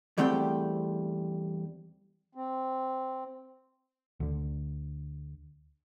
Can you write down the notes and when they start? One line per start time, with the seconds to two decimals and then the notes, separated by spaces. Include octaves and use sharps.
0.18 E2 G3 A3 C4 G4 G5
2.35 C4
4.20 D2 D3